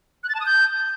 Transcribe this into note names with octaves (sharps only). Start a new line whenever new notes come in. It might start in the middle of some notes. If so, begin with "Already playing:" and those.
F#6
A6
A5
D#6
G6